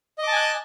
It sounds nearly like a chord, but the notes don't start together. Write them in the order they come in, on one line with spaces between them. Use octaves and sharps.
D#5 D6 A5 G#5 F#6